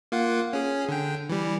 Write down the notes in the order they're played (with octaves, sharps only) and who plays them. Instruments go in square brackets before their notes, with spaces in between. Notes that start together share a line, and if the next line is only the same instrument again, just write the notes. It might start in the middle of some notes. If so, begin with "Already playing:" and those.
[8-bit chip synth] A#3 F4 F#5
C#4 G#4
D3 G5
E3 G3